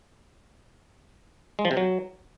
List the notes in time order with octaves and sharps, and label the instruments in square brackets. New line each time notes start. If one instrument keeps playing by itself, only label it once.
[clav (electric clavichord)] G#3
F3
C3
F#3